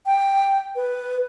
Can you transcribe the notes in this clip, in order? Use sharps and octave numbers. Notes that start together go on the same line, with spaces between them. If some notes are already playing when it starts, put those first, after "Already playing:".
G5
B4